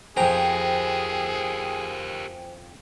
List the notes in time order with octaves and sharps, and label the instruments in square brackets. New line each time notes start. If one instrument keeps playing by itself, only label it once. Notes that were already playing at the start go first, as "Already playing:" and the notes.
[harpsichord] F2 A#5 [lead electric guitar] G4 A#4 [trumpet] G#4 [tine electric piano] C5 G5 G#5